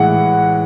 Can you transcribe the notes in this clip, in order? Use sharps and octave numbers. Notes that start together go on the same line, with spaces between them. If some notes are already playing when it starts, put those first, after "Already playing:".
Already playing: A2 E3 G#3 F#5